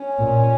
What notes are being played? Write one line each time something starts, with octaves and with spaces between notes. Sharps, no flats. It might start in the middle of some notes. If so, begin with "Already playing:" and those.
Already playing: C#4
A#2